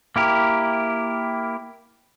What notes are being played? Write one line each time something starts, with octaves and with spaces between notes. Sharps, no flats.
A#3 E4 G4 A#4